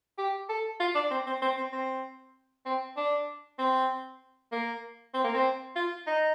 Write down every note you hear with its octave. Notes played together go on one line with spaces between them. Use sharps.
G4
A4
F4
D4
C4
C4
C4
C4
C4
C4
D4
C4
A#3
C4
A#3
C4
F4
D#4